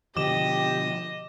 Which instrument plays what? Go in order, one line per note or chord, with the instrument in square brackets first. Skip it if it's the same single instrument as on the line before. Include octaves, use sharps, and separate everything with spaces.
[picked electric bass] B2 D3 F3 [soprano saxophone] G4 [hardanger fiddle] D#5 [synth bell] D6 E7